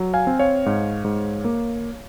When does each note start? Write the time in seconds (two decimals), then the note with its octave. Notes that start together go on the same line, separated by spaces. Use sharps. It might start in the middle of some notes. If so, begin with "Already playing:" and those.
Already playing: F#3
0.14 F5 G#5
0.27 C4
0.39 C#5 F5
0.66 G#2
1.05 G#2
1.45 A#3